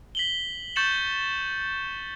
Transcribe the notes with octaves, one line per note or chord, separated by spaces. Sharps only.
B6 F#7 G7
C#6 G6 A6 C#7 E7 F#7